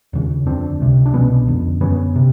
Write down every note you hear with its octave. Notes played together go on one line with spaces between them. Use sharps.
D#2 C#3
F2 D3 C4 D4
C#2 C3
D4
C2 B2 B3 C#4
F2 D3
F#2 D3 B3 C#4
C3